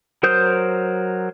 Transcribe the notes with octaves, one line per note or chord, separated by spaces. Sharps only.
F#3 A#4 C5 D#6 G6